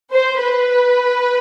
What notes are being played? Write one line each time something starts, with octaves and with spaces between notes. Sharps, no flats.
C5
B4